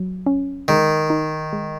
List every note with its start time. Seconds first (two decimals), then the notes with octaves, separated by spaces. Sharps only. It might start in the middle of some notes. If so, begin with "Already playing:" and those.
Already playing: F#3
0.26 C#4
0.68 D#3 G#3
1.10 D#4
1.53 G#3